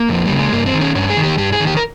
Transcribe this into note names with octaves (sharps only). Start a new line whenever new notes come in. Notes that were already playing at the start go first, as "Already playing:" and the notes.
Already playing: A#3
F2 F3
C#3 G3
G#3
G2 A#3
C4
D#3
C#4
G2 C#4
G#4
D#3
G4
G2 G4
G#4
D#3
G4
A#4